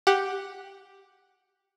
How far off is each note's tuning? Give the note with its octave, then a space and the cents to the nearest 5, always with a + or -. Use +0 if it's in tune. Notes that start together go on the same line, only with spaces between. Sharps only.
G4 +0 F#5 +0